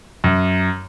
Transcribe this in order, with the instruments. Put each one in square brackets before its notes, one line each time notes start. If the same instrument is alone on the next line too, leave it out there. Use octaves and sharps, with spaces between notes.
[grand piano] F#2